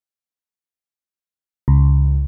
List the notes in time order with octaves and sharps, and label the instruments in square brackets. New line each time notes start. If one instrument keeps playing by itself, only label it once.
[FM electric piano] C#2